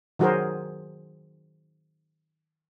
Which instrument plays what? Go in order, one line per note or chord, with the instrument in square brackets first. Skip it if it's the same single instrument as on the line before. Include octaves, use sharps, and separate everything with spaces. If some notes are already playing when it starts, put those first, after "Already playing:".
[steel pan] D#3 F#3 F#4 G#4 A#4 C5